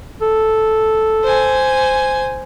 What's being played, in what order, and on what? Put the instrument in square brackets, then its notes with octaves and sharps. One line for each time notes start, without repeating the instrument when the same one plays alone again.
[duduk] A4
[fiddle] C5 G#5